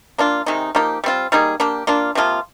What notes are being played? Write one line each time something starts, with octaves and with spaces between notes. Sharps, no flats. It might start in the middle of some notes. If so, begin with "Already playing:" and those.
A#3 D4 F4
C3 D#3 G#3 D#4
F3 A#3 D#4 G4
G3 C4 F4
G3 A#3 D#4 G#4
A#3 D4 G4
A#3 D4 F4
C3 F3 A#3 F4